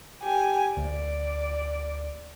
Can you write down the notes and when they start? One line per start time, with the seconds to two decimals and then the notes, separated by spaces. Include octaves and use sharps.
0.23 G4 G#5
0.77 D2 D5